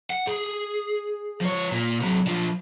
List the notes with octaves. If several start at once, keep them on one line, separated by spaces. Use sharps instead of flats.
F#5
G#4
F3 C#5
A#2 A#3
C3 F#3
F3 D4